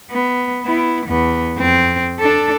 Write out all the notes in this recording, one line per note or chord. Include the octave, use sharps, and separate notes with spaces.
B3
B3 E4
E2 B3
F2 C4
D4 A4